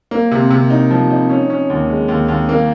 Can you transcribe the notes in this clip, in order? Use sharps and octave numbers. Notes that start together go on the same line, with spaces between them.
A#3
C3
C3
D#4
F3
D#4
C#4
C#4
D#2
G#3
D#2
D#2
A#3